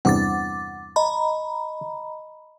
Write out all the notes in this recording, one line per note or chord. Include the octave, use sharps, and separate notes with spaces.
E2 G2 C3 F#5 D6 A6
D#5 A#5 B5